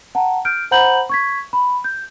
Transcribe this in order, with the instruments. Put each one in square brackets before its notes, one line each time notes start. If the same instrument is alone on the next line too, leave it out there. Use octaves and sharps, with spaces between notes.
[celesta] F#5 A5 A#5
F6 G6 D7
C5 F#5 A#5 B5 G6 F#7
C#6 G#6 B6
B5
G6